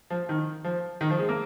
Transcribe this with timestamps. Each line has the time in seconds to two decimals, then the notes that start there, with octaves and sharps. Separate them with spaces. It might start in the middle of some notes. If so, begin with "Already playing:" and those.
0.10 F3
0.29 D#3
0.64 F3
1.01 D#3
1.11 F3
1.19 G#3
1.29 A#3